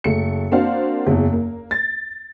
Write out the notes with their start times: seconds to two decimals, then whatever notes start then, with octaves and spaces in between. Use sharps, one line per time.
0.04 F#1 A3 C#7
0.51 A#3 C4 D4 F#4 C5 F5
1.06 F#1 E2
1.33 A#3
1.71 A6